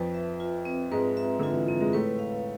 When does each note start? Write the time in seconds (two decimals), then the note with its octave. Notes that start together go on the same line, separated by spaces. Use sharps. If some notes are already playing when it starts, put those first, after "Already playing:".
Already playing: F2 F3 B4
0.14 E5
0.40 F4
0.65 C4
0.91 G#2 G#3 B4
1.17 E5
1.39 D3 F4
1.53 E3
1.67 F3 C4
1.80 G#3
1.93 A2 A3 B4
2.19 F5